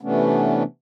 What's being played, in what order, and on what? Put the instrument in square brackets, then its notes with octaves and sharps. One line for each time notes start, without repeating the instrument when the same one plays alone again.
[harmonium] C3 E3 A3 B3 C#4 D4